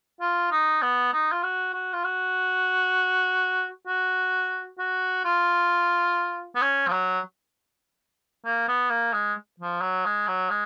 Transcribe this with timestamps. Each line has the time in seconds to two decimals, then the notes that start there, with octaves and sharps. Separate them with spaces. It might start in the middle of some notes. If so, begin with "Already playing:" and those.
0.21 F4
0.52 D#4
0.82 B3
1.13 D#4
1.32 F4
1.44 F#4
1.74 F#4
1.93 F4
2.04 F#4
3.87 F#4
4.79 F#4
5.25 F4
6.56 B3
6.61 C#4
6.88 F3
6.92 F#3
8.45 A#3
8.68 B3
8.90 A#3
9.13 G#3
9.60 F3
9.82 F#3
10.05 G#3
10.28 F#3
10.50 G#3